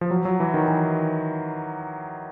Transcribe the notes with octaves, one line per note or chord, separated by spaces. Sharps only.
F3
F#3
F#3
E3
D#3
E3